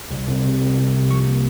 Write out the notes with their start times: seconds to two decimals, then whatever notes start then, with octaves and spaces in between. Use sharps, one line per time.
0.11 C2
0.27 C2
0.44 C3
0.61 C2
0.77 C2
0.94 C3
1.10 F3 C#6
1.27 A#3